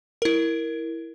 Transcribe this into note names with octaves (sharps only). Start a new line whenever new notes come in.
E4 A#4